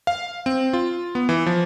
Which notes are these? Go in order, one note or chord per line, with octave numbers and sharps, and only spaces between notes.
F5
C4
F4
B3
E3
F3